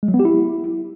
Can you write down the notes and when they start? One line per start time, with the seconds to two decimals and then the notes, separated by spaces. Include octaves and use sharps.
0.03 G#3
0.08 F#3
0.14 B3
0.20 G4
0.25 E4